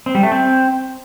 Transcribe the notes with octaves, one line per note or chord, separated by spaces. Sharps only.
C4
G3
A3
C4